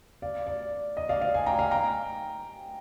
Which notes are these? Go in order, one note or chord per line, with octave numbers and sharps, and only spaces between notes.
D5 F5
D5
D#5
D5 F5
D5 F5
F5 G#5
G5 A#5
F5 G#5
G5 A#5